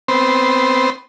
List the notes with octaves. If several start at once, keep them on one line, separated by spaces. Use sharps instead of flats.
B3 C4 C5